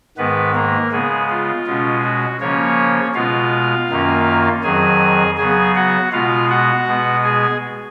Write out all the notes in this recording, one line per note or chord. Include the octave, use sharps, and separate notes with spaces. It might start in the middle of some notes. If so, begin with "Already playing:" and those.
G#2 D#3 G#3 B3 B4
A#3 A#4
C#3 G#3 B3 G#4
F4
B2 G#3 C#4
F#4
C#3 F3 A#3 C#4 C#5
B2 G#3 B3 F4 F5
F#2 D#3 A#3 C#4
F2 D#3 F#3 G#4 G#5
C#3 F#3 B3 G#4 G#5
F#4 F#5
B2 G#3 B3 F4 F5
F#4 F#5
B2 G#3 B3
G#4 G#5